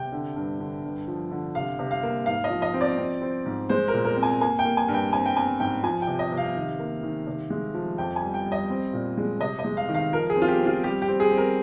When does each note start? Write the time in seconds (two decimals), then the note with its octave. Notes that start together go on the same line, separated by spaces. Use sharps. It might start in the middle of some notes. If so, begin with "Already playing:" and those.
Already playing: C3 G5
0.12 D3
0.36 G2
0.60 D3
0.83 G2
1.08 F3
1.31 D3
1.55 C3 F5
1.79 C3
1.91 F5
2.03 A#3
2.26 G#2 F5
2.44 D#5
2.50 F3
2.62 D#5
2.74 C4
2.81 D5
2.98 C4
3.22 C4
3.46 G#2
3.69 G#3 C5
3.88 A#4
3.94 A#2
4.05 A#4
4.17 C4
4.23 G#5
4.41 A#3 G#5
4.59 G5
4.65 A#3
4.77 G#5
4.88 G2
4.94 G5
5.12 C4 G#5
5.26 G5
5.36 C4 G#5
5.60 G#2 G5
5.83 F3 G#5
6.02 G5
6.07 C3
6.19 D#5
6.32 C3
6.37 F5
6.56 D#3
6.79 A#3
7.03 D#3
7.27 C3
7.50 G#3
7.74 F3
7.98 F2 G5
8.16 G#5
8.22 G3
8.34 G5
8.46 G3
8.52 D#5
8.70 C4
8.93 A#2
9.18 G#3
9.40 C3 D#5
9.59 D#5
9.64 G#3
9.77 F5
9.89 D#3
9.95 F5
10.13 F3 A#4
10.30 G#4
10.36 C4
10.42 F4
10.48 G4
10.59 C4
10.66 F4
10.84 G3 G4
11.02 G4
11.08 C4
11.20 G#4
11.32 C4
11.38 A#4